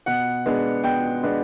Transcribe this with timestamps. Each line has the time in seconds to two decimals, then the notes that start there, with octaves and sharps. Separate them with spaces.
0.06 B2 F#5
0.46 G#3 B3 D4
0.84 B2 G5
1.23 G#3 B3 D4